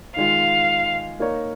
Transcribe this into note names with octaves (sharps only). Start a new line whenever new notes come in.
D#3 G#3 F4 F5
A#3 D#4 A#4 C#5